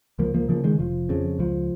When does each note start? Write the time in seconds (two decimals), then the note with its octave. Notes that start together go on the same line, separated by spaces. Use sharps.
0.19 C#2 F3 A#3
0.34 F3 A#3
0.48 C#3 F3 A#3
0.64 D#3 G#3
0.79 F1 F3
1.09 F2 C#3
1.39 C#2 F3